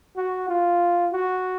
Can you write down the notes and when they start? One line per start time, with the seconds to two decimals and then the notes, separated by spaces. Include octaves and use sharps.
0.16 F#4
0.48 F4
1.13 F#4